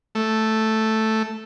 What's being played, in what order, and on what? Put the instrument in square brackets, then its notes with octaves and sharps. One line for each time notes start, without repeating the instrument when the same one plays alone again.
[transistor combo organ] A3